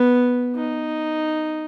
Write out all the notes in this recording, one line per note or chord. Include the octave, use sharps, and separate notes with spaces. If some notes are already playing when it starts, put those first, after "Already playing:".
Already playing: B3
D#4